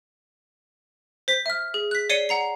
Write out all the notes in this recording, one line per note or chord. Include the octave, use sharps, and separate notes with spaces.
C5 B6
E5 F6
G#4
F#6 B6
C#5 D5 C7 C#7 D#7 G7
F#5 A#5 C7